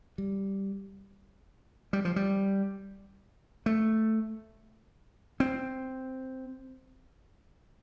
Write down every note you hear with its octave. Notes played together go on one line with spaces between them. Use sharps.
G3
G3
F3
G3
A3
C4